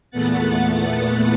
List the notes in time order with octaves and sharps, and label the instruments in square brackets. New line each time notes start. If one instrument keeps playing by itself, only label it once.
[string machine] E2 A#2 A3 B3 F#5 A6